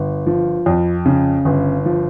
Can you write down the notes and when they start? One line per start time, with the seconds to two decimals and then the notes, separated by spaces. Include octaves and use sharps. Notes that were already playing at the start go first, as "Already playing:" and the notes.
Already playing: G1
0.26 F3
0.66 F2
1.06 C#3
1.45 G1
1.86 F3